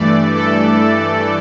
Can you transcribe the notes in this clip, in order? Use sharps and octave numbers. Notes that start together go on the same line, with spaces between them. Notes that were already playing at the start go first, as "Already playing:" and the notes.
Already playing: G2 E3 A3 D5
A4